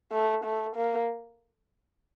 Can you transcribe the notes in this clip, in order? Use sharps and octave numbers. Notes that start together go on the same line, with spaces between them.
A3
A3
A#3